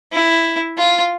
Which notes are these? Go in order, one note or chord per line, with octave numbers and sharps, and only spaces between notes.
E4
F4